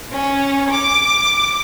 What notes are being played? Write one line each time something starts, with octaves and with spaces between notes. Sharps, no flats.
C#4
D6